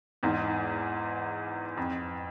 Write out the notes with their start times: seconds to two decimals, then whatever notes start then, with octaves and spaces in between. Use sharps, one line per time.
0.23 E2 G#2
1.77 F2